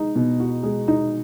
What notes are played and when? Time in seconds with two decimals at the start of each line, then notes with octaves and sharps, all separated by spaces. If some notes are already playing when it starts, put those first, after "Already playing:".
Already playing: G#3 D#4
0.15 B2
0.40 F#4
0.63 G#3
0.88 D#4